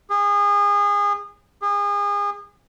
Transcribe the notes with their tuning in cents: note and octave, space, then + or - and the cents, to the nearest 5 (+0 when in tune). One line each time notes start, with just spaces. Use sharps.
G#4 -30
G#4 -35